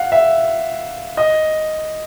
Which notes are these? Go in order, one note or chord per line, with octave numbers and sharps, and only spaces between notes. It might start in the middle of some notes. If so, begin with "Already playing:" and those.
Already playing: F5 F#5
E5
D#5